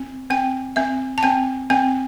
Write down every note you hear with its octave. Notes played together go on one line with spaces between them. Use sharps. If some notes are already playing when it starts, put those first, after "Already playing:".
Already playing: C4
C4 G5
C4 E5
A5
C4 G5
C4 G5